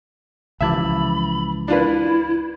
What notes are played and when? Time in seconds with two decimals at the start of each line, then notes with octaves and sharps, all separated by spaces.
0.61 C#2 E3 F3 E5 A5 B5 D6
1.68 D4 E4 F4 B4